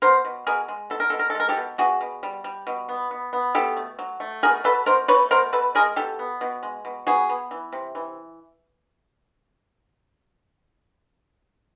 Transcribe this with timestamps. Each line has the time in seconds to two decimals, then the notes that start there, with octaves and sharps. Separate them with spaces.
0.02 B3 A#4 C5
0.25 B2
0.47 B2 G#4 A#4
0.68 G#3
0.90 B2 A4
1.00 A#4
1.10 B2 A4
1.19 A#4
1.30 A4
1.35 G#3 A#4
1.49 G4 A4
1.57 B2
1.78 B2 F#4 G#4
2.01 B2
2.23 G3
2.44 G3
2.67 B2
2.89 B3
3.11 B3
3.33 B3
3.55 B2 G4 A4
3.77 A3
3.99 F#3
4.20 A3
4.43 B2 G#4 A#4
4.64 F#3 A4 B4
4.86 B2 A#4 C5
5.08 A3 B4 C#5
5.31 B2 A#4 C5
5.53 B2 A4 B4
5.75 G#3 G#4 A#4
5.96 B2 G4 A4
6.19 B3
6.41 B2
6.63 G#3
6.85 B2
7.07 B3 F#4 G#4
7.29 B3
7.51 E3
7.73 C3
7.95 E3